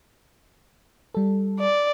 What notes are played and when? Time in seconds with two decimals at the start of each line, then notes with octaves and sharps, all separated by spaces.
1.15 G3 A4
1.59 D5